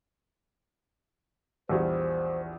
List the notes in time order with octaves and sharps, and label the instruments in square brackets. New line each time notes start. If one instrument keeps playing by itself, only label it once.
[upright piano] A#1 E2 G3 [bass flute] C5